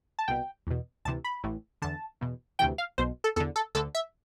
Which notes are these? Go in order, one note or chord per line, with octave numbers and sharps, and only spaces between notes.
A5
C2 B2 G5
E2 B2
D2 C3 E3 A5
B5
A1 A2 E3
E2 D3 A5
E2 B2
D2 C3 E3 G5
F5
B1 B2 C5
A4
E2 D3 A4
A4
D2 D3 A4
E5